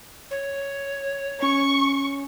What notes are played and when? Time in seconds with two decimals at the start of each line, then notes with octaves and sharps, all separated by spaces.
0.31 C#5
1.42 C#4 C#6